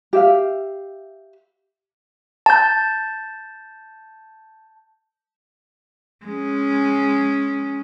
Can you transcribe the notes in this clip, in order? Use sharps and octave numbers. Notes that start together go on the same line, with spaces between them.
G4 E5 F5
A5 G6
G#3 C#4